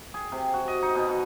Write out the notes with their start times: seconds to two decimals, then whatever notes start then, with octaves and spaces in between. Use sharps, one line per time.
0.14 G#4
0.32 C3
0.54 F#4
0.68 D#5
0.82 D#4
0.95 B2
1.09 F#4